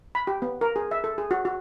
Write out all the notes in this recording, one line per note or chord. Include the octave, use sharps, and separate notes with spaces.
B5
G4
B3
A#4
G#4
E5
A4
G#4
F#4
F#4